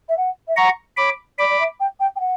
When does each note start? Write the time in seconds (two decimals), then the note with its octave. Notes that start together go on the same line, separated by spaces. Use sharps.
0.08 E5
0.17 F#5
0.47 E5
0.57 F#5 A#5 C#6
0.97 C#5 B5 D6
1.38 D5 B5 D6
1.49 D5
1.59 E5
1.80 G5
2.00 G5
2.15 G5
2.20 F#5